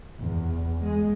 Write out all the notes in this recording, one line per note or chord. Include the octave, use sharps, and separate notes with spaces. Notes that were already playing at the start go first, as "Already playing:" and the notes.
E2
G#3